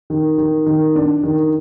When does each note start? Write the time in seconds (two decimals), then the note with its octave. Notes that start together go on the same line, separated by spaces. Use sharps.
0.10 D#3
0.38 D#3
0.66 D#3
0.96 D4
1.23 D#3